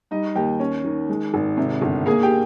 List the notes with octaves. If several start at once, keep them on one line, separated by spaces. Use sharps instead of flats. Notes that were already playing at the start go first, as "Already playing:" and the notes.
G3 D#4 D#5
D#2 G4 G5
C#4
D#3
G#3
G#1
C3
G1
A#3 G#4 G#5
G4 G5